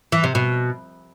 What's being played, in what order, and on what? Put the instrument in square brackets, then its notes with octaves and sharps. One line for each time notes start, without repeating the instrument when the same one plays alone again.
[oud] E3
C3
B2